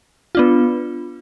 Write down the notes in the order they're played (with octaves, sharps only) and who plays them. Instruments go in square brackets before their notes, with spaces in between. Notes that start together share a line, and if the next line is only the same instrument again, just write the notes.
[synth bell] B3 D4 F4